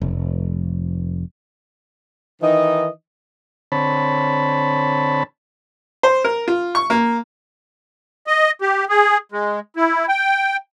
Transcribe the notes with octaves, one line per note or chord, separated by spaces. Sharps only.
F1
D#3 E3 D#4 D#5
D3 C4 C#5 A5 B5
C5
A#4
F4
C#6
A#3
D#5
G4
G#4
G#3
E4
G5